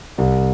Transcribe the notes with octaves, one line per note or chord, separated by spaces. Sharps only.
C2